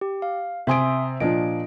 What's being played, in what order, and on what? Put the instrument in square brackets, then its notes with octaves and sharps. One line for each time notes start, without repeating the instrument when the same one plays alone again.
[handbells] G4
F5
[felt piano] C3 G#5 D7 [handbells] E5 C6 D#6
[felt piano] A#2 F3 D4 [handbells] D#5 D7